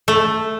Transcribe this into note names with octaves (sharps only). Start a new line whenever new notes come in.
A3